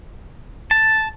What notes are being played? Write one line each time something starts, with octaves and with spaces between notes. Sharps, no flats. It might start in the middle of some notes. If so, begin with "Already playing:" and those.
A5